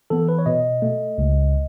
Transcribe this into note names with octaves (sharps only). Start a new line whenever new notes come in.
E3 B3 A4
B4
C#5
B2 D#5
A3
C#2